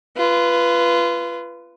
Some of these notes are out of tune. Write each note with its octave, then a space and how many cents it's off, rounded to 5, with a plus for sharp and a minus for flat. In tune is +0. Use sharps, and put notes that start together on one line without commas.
F4 -25 B4 +0